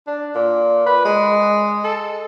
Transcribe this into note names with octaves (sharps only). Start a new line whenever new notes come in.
D4
A#2
B4
G#3
A4